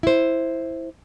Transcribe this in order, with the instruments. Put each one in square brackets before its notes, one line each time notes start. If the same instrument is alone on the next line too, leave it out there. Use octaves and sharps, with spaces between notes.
[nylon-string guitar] E4 C5